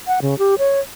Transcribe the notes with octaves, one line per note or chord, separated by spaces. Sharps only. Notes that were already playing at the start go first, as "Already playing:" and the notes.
F#5
C#3
G4
C#5